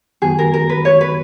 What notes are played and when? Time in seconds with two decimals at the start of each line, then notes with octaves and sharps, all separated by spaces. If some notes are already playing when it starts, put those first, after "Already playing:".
0.22 F#2 D#3 F#3 B3 F#4 G#4
0.39 A#4
0.54 A#4
0.69 B4
0.85 C#5
1.01 B4